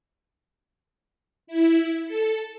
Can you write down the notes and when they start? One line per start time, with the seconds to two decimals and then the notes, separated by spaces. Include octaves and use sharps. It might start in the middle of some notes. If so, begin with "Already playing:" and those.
1.47 E4
2.06 A4